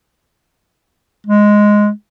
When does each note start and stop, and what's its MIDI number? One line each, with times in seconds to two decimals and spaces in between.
1.27 1.89 56